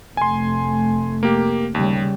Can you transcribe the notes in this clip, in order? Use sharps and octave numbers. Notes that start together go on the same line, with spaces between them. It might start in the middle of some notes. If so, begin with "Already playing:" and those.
F1 A3 G#5 C6
A#3 G4
D#2 C#3 G3